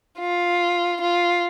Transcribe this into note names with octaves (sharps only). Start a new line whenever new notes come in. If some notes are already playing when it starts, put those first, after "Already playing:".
F4
F4